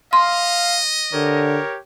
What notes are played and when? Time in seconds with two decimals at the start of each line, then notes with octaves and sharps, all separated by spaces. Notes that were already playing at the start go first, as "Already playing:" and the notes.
0.13 D#5 F5 C6
1.13 D3 G4 A#4 C#5